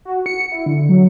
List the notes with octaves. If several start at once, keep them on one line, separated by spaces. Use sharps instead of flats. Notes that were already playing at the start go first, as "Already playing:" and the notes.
F#4
C#7
E4
D3
F#3